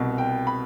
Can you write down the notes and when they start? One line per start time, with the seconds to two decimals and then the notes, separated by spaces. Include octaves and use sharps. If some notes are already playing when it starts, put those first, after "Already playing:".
Already playing: C2 B2
0.18 G5
0.47 B5